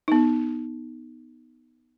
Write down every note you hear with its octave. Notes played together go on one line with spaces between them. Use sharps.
B3 D#4